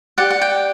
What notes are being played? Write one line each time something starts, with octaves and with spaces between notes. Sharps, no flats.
G4 D5 F#5
F#5
G5